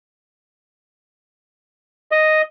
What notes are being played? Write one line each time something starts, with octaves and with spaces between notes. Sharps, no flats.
D#5